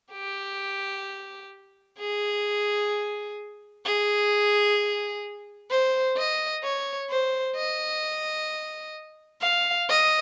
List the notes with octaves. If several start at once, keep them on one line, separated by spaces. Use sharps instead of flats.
G4
G#4
G#4
C5
D#5
C#5
C5
D#5
F5
D#5